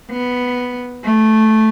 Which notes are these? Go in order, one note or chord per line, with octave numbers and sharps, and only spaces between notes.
B3
A3